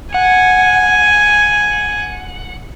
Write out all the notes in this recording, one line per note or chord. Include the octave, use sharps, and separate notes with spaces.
F#5 G#5